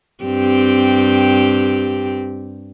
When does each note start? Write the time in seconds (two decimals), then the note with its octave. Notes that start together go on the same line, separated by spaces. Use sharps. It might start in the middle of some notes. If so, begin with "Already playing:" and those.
0.24 G2 C4 G4